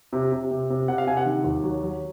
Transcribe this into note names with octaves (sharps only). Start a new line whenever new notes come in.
C3
C3
C3
C3
C3 F#5
F5
C3 G#5
F#5
D#3
D#2
F#3
F#3